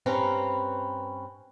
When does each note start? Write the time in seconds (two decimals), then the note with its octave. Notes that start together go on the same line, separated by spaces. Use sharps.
0.06 G2 C4 C#4 B4 A#5